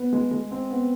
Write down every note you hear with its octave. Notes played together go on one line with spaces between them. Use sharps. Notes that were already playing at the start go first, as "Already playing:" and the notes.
Already playing: B3
G#3
G#3
C4
B3